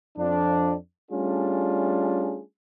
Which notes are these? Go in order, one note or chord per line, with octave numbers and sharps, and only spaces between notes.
F2 F3 D4
G3 A3 C#4 D4 F4 G#4